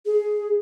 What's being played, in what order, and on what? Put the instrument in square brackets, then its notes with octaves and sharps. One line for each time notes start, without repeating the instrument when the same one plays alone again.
[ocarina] G#4